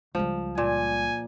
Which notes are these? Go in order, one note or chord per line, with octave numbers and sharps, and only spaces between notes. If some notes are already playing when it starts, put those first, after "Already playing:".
C#2 F3 G3
A#2 G#5